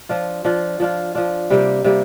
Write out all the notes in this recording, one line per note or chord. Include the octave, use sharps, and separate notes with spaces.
F3 D4 F4
F3 D4 F4
F3 D4 F4
F3 D4 F4
C3 G3 A#3 G4
C3 G3 A#3 G4